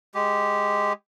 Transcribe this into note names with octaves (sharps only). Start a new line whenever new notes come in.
G#3 G4